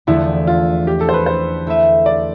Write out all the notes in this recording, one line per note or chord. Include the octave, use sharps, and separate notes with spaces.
E2 D3 F3 A3 E4
F4
G4
A4
C5
B4
C5
A3 E4 B4 E5
D5